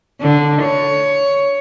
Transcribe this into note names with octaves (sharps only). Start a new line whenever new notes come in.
D3
C#5